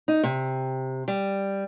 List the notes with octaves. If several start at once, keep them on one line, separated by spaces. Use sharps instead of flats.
D#4
C3
G3